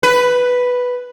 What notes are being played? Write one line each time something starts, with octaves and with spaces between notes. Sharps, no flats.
B4